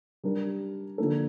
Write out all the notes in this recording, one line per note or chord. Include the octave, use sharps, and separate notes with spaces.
G3 D4 G4 A#4
D3 F3 A#3 D4 A4